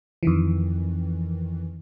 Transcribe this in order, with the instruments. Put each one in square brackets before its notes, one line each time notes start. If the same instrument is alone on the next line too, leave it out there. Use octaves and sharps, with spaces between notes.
[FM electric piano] F2 D#3 E3